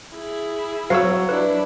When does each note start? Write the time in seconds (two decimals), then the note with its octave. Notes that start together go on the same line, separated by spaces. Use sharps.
0.13 E4 G#4
0.90 F#3 C4 F#4 F5 E6
1.29 D4 E4 B4